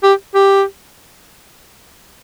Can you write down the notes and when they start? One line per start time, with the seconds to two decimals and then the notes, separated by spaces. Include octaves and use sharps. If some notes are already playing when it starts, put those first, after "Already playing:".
0.03 G4
0.35 G4